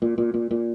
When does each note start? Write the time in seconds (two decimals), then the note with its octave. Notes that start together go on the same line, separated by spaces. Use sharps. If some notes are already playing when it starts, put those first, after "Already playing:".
0.02 A#2
0.18 A#2
0.34 A#2
0.51 A#2